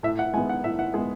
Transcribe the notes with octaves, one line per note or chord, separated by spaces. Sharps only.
A2 E5
F#5
G#3 B3 G#5
F#5
A2 E5
F#5
G#3 B3 G#4